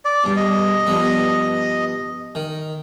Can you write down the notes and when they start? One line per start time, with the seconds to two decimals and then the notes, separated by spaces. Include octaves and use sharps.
0.05 D5
0.24 G2 B2
0.37 D#5
0.87 G2 F3 B3
2.35 D#3